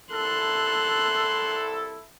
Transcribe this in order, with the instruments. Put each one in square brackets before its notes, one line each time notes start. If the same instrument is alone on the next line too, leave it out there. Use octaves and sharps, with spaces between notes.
[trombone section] C2 E4 A4 [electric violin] C6 F#6